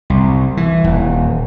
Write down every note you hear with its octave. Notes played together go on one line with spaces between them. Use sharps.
C2
E3
D#1